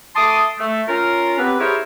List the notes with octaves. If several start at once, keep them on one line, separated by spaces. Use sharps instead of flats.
A3 A5 C6 D6 D#6
A3
C#4 F4 A#4
B3 C4 G4 B4
E4 G4 G#4 A#4 C5 C#5